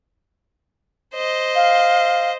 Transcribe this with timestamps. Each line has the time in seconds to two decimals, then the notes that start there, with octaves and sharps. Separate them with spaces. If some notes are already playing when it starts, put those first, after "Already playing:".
1.14 C5 D#5
1.55 F5